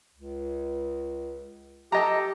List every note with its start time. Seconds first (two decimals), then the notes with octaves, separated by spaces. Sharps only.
0.14 C#2
1.92 G4 A4 D#5 A#5